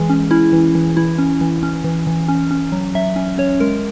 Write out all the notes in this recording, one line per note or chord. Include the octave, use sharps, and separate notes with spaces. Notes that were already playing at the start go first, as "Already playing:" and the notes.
Already playing: E3 G#3 G#4
C#4
C#4 E4
E3
E3
E3 E4
C#4
E3
C#4
E3
E3
C#4
C#4
F#3
F#3 E5
C#4
C#4 C#5
G#3 A#4